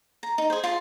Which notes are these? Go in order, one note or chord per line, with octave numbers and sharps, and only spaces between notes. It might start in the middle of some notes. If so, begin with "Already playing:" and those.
A#5
D#4
G#4 C5
F4 A5 C6